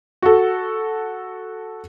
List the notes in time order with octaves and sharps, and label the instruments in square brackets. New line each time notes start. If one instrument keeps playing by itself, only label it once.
[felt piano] F#4 A4